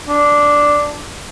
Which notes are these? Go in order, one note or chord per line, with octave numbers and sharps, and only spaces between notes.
D4